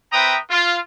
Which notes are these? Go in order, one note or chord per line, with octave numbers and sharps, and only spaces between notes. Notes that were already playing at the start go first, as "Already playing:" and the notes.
C4 B4 E5 G5 A#5 D#6
F4